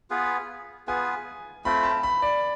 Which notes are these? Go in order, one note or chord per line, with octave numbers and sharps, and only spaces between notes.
B3 F4 G#4 B4
B3 F4 G#4 B4 G#5
A3 C4 F4 B5
A5
B5
D5